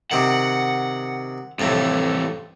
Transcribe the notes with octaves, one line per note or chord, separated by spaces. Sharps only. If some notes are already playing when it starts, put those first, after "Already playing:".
C3 D#3 F#5
F2 A2 C3 E3